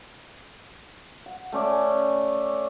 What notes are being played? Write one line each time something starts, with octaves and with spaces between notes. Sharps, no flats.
F#5
A3 C#4 D5 G#5